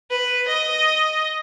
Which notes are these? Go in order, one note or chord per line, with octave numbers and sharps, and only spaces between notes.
B4
D#5